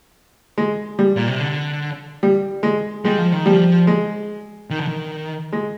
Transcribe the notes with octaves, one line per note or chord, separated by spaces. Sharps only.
G#3
G3
A#2
C3
D3
G3
G#3
G3 G#3
F3
D#3
F3 G3
G#3
D#3
D3
D#3
G#3